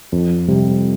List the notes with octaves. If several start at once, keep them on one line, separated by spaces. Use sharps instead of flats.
F2
C3 G3